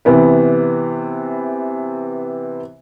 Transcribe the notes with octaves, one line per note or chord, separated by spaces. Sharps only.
C3 E3 B3 B4